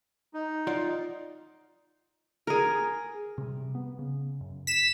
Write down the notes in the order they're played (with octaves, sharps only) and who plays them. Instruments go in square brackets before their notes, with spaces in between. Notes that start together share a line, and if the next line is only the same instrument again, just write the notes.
[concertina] D#4
[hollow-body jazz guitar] F4 D5 F#5
[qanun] G#4 A#4
[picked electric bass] C3 G3
B3
C#3
F#2
[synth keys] B6 E7